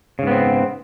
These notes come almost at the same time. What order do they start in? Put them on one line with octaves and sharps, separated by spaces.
C#3 G#2 B3 C4